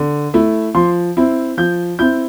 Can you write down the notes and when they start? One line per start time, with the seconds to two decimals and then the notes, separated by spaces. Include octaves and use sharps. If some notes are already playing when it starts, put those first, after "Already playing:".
Already playing: D3
0.34 A3 E4
0.75 F3 C6
1.17 C4 E4
1.57 F3 G6
1.99 C4 E4 G6